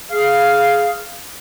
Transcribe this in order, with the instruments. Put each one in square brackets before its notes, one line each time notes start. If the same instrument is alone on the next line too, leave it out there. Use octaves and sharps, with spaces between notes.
[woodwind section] G#4 F5